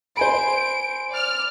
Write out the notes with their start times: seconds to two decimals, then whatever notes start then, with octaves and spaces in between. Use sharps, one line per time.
0.17 C5 G#5 B5 D7
1.12 D5 F6